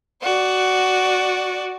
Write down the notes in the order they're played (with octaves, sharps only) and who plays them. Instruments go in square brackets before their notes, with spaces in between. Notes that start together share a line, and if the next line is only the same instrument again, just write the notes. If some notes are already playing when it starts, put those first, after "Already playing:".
[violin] F#4 D5